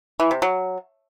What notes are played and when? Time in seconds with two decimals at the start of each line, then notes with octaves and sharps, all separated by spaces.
0.20 E3
0.31 C3
0.42 F#3